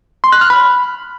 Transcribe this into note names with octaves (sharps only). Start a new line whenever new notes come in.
C6
F#6
F6
B5